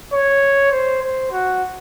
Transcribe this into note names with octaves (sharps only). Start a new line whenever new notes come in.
C#5
C5
C5
F#4